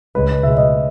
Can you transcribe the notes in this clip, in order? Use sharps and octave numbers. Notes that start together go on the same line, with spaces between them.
C#2 C#3 G#3 B4
C#2 B2 G#3 E5
D#5